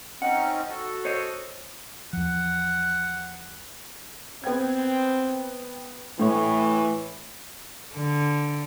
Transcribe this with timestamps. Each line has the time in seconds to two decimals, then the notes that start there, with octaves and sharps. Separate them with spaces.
0.22 C4 C#4 D#4 F#5
0.69 F#4 A4
1.05 C5 C#5 D#5
2.13 E2 F3 F#5
4.44 B3 C4 G5 G#6
6.19 A2 E3 C#5
7.95 D3